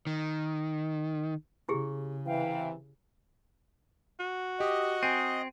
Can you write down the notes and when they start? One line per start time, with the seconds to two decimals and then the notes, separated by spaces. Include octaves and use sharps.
0.07 D#3
1.69 C#3 E4 G4 G#4
2.26 C3 E3 F5 G5
4.20 F#4
4.60 G4 D#5
5.03 C4 G#5 D#7